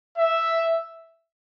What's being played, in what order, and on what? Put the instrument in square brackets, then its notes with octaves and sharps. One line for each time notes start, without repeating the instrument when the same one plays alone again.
[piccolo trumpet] E5